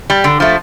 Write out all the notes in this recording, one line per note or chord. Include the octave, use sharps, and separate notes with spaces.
G3
D3
F3 A3